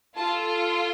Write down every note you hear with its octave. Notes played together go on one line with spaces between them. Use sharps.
F4 A4 A5